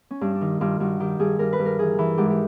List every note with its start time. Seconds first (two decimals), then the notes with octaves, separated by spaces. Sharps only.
0.11 C#4
0.21 G2 D4
0.35 D4
0.41 D#3 D#4
0.61 G2 F4
0.80 G2 F#4
1.00 D#3 G4
1.20 G2 G#4
1.39 G2 A#4
1.53 B4
1.59 G2
1.65 A#4
1.79 E3 G#4
1.99 E3
2.18 G#2 G4
2.30 G4